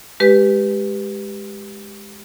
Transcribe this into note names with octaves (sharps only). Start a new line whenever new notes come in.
G#3 G4 B4